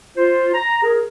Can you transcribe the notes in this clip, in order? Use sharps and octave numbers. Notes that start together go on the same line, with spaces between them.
F4 C5
A#5
G#4 A#4